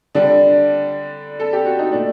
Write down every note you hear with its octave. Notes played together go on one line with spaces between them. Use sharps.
D3 G3 D4
A4
G4
F#4
D#4
A#2 A3 D4